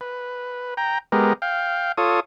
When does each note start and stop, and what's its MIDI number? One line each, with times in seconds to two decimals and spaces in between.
0.01 0.74 71
0.77 0.98 79
0.77 0.98 82
1.12 1.33 56
1.12 1.33 59
1.12 1.33 67
1.12 1.33 70
1.42 1.92 77
1.42 1.92 79
1.98 2.20 65
1.98 2.20 69
1.98 2.20 73
1.98 2.20 87